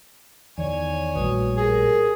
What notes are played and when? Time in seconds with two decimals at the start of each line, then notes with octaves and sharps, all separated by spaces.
0.58 E2 D#3 C#5 D5 G#5
1.15 A#1 A2 G3 F#4 B4 D#6
1.57 G4 G#4 A#4